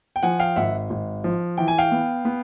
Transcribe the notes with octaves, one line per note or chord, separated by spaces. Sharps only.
G5
F3 F#5 G#5
F5 G5
G#1 E5 F#5
G#1
F3
E3 G5
G#5
F5 G5
B3
B3